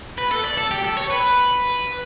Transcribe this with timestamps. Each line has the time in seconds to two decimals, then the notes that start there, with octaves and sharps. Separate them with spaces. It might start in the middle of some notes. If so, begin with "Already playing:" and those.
0.18 B4
0.31 A4
0.45 D5
0.58 A4
0.71 G4
0.84 A4
0.97 C#5
1.10 B4